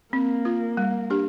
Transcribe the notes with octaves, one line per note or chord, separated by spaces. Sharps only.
A#3 C4
F4 A#4
G3
D4 G4